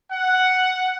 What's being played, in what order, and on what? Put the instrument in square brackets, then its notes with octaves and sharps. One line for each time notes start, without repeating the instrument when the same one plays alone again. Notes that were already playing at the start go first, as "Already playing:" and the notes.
[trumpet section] F#5